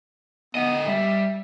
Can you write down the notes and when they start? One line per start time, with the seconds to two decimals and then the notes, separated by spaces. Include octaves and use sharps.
0.55 D3 B3 D#5
0.88 G3 E5